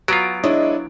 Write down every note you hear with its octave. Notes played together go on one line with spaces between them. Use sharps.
F#3 B3 F4 F#4 G#5 A#5 D7
G#3 D4 E4 C#5 D#5